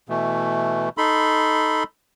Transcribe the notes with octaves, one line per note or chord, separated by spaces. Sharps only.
B2 E3 A3
D#4 A4 B5 C6